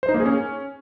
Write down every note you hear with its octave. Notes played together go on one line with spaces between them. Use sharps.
C5
D#4
A#3
G#4
C#4